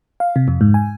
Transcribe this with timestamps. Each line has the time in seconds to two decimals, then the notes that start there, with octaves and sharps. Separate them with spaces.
0.20 F5
0.36 C3
0.48 F2
0.61 G#2
0.74 G#5